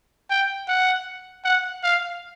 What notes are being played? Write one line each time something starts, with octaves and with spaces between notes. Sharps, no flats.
G5
F#5
F#5
F5